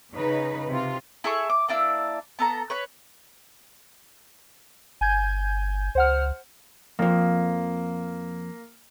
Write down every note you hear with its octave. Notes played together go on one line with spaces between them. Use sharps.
C#3 D#4 B4
C3 F4
E4 G#4 A4 C#6
D6
A#3 D4 E4 E6
B3 A4 A#5
B4 C#5 B5
G1 G#5 G6 G#6
C#2 C5 F#5 F6
F2 F3 A#3